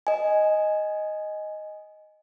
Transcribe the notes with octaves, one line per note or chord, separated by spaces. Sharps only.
D#5 G#5